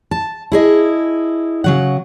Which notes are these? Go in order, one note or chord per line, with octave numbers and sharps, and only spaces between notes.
A5
E4 G#4 D#5
C#3 F#3 F#5